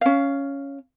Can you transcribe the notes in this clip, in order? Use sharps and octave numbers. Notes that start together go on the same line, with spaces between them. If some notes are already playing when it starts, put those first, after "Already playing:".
C#4 F5